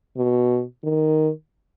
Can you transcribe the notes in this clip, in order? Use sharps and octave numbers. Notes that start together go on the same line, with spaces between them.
B2
D#3